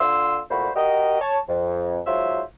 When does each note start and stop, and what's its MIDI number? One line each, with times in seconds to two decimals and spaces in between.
0.01 0.41 50
0.01 0.41 65
0.01 0.41 84
0.01 0.41 88
0.51 0.71 36
0.51 0.71 46
0.51 0.71 57
0.51 0.71 66
0.51 0.71 72
0.51 0.71 83
0.76 1.19 66
0.76 1.19 67
0.76 1.19 70
0.76 1.19 75
1.21 1.39 73
1.21 1.39 81
1.48 2.00 41
2.07 2.42 44
2.07 2.42 54
2.07 2.42 65
2.07 2.42 72
2.07 2.42 76